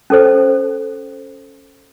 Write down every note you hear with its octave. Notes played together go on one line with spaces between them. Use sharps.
C#4 A4 C5